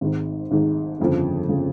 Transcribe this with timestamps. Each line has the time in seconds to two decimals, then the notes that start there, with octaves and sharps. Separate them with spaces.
0.01 G#1 G#2 D#3
0.51 G#1 G#2 D#3
1.00 G1 F2 C#3 F3
1.49 C#3 F3